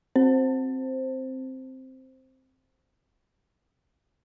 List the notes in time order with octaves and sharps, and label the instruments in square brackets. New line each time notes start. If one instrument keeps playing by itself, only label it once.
[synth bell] C4 C5